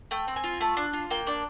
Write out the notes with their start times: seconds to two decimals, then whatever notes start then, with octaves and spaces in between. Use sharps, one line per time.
0.11 A3 G5
0.28 C4
0.36 G#5
0.44 F4
0.61 A3 A5
0.77 D4
0.93 F4
1.11 A#3 G5
1.27 D4 D5